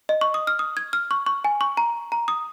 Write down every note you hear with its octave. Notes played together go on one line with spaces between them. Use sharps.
D#5
C#6
D#6
F6
D#6
G#6
F6
C#6
C#6
G#5
C#6
A#5
A#5
D#6